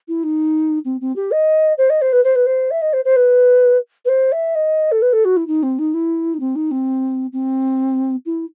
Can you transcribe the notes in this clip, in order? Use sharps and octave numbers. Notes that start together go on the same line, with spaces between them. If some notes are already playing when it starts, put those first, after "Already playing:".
E4
D#4
C4
C4
G4
D#5
C5
D#5
C5
B4
C5
B4
C5
E5
D#5
C5
C5
B4
B4
C5
E5
D#5
A4
B4
A4
F#4
E4
D#4
C4
D#4
E4
D#4
C4
D#4
C4
C4
E4